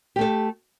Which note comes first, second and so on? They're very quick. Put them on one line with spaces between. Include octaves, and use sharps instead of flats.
G4 A3 A4